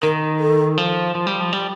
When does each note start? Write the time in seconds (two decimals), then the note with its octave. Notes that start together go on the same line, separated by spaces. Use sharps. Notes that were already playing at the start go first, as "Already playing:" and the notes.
0.02 D#3 A#4
0.40 A4
0.77 F3
1.15 F3
1.27 G3
1.41 F3
1.53 G3